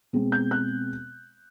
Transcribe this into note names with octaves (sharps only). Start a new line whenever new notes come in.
B2 G#3 C4
G6
F#6